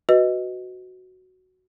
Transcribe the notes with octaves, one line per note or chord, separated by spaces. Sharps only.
F#4 B4 D#5